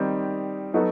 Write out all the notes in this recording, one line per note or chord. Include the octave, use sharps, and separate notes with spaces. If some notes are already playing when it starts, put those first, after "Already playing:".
Already playing: D#3 G3 C4 D#4
F#3 B3 D#4 F#4 A4